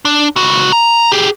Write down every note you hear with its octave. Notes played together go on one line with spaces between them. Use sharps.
D4
C#2 F#4
A#5
G4 G#4